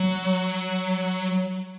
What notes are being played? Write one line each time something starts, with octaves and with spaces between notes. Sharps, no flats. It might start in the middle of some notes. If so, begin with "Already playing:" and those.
Already playing: F#3